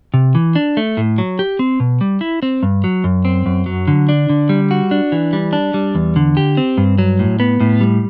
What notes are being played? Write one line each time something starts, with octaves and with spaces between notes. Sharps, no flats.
C3
E3
D4
A3
A2
F#3
G4
C4
B2
G3
E4
C4
G2
F#3
F#2
C4
F#2
F#3
D3
D4
D3
G3
F#4
D4
E3
G3
D4
G3
E2
D3
G4
C4
G2
F#3
A2
B3
A2
G3